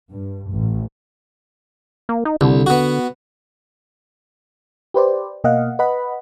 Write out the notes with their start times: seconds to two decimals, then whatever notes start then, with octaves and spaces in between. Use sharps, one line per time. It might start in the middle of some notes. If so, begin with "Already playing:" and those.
0.10 G2
0.51 A1
2.09 A#3
2.25 D#4
2.41 C2 D3
2.66 B3 F#4
4.94 G4 B4 C5 D5
5.44 B2 A#3 D#5 F5 F#5
5.79 B4 D#5 F#5 B5